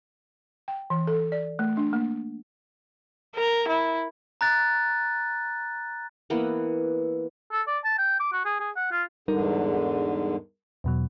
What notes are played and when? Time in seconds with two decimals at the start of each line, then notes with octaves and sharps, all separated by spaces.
0.68 G5
0.90 E3
1.07 A4
1.32 D5
1.59 A3
1.77 D4
1.93 A#3
3.36 A#4
3.69 E4
4.41 A#5 F#6 A6
6.30 E3 A#3 B3
7.52 A4
7.67 D5
7.84 A5
7.98 G5
8.20 D6
8.32 F#4
8.45 G#4
8.60 G#4
8.76 F#5
8.91 F4
9.28 E2 G#2 D3 G3 D#4 A#4
10.84 E2 B2 F#3